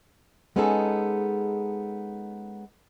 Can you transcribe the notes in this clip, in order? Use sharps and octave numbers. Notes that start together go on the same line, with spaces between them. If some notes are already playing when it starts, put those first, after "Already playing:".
G#3 B3 C#4 D#4 G#4 A4